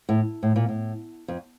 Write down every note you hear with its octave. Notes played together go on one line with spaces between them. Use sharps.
A2
A2
A#2
A2
F2